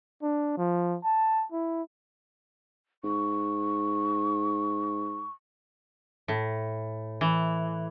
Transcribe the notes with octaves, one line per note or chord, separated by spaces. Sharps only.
D4
F3
A5
E4
G#2 C#6
A2
E3